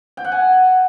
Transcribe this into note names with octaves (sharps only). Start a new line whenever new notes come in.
G5
F#5
G#5